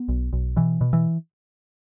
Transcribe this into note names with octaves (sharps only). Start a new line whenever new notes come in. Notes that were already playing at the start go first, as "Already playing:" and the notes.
Already playing: B3
B1
B1
B2 E3
B2
E3